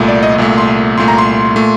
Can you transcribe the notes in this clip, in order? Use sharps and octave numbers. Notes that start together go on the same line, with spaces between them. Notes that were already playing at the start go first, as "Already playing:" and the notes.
Already playing: C2 A#2 A3
D5
D#5
C2 A#2 A3
C6
C2 A#2 A3 C6
A#5
C6
A#2 A3